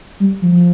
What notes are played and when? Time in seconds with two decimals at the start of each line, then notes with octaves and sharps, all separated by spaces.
0.20 G3
0.42 F3
0.52 F3